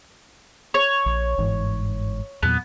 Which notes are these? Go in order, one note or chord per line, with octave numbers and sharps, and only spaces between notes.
C#5
A#1
G1 G#2 E3
E2 A#2 F#3 B3